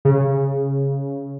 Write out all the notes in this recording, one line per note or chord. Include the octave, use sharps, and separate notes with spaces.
C#3